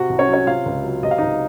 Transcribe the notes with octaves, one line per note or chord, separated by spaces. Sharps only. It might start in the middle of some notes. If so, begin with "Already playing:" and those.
Already playing: C3 F#4
C2
C#4 C#5
F#3
C#4 C#5
C3 F4 F5
C#2
F#3
C3 D#5
F5
C#2 D#4 D#5